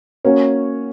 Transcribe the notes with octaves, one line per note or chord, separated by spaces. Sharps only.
A#3 C#4 F#4 C#5